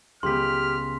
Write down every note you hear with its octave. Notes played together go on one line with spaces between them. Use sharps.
C#2 G#3 B3 G4 C6 F6 B6